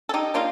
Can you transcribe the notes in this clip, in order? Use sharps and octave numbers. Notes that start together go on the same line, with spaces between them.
A4
D#4 G4
G3 A#3 D4 F4